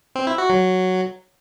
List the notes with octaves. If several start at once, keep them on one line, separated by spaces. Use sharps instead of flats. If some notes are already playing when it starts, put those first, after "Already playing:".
C4
E4
F#4
F#3